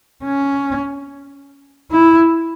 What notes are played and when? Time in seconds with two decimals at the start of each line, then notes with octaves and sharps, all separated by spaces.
0.24 C#4
1.91 E4